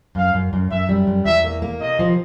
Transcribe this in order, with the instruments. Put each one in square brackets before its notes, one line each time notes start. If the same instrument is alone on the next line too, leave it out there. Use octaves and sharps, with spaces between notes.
[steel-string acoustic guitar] F#2 [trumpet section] F5
[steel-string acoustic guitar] F#2
F#2
[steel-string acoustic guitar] F#2 [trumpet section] E5
[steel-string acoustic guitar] G3
F#2
[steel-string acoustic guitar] E2 [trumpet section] E5
[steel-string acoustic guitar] A#3
A#3
[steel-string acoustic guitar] C3 [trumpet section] D#5
[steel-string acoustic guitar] F3